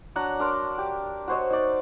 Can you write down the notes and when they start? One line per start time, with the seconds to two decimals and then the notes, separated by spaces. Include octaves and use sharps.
0.16 F#3 D4 F#5 A#5
0.39 D4 A#4 C6 D6
0.78 G4
1.28 F#4 C5 C#5 D#5
1.50 D#4 D5